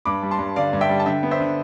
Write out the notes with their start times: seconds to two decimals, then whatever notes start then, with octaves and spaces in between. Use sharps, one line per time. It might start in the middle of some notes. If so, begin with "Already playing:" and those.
0.05 G2 B5 D6
0.23 G3
0.31 A5 C6
0.39 G2
0.56 D3 D5 F5
0.73 G2
0.81 E5 G5
0.90 G3
1.00 A5
1.06 D3 E5 G5
1.23 B3
1.31 C5 E5
1.40 D3